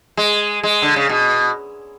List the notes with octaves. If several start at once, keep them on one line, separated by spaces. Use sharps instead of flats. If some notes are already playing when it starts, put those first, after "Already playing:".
G#3
G#3
D3
C#3
B2